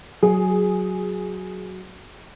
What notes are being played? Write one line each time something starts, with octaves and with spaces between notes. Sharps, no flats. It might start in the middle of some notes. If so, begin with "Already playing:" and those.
F#3 G#4